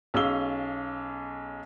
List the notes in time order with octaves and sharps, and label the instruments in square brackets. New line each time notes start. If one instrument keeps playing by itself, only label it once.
[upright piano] B1 C#4 G#4 F5 E6 G7